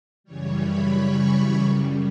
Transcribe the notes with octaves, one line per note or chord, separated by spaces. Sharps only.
F#2 C#3 E3 G3 C#5
B5
C#6
C#6
F#2 C#3 G3